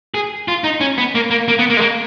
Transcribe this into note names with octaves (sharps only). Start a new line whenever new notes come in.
G#4
F4
D#4
C#4
B3
A#3
A#3
A#3
B3
A#3
G#3
A#3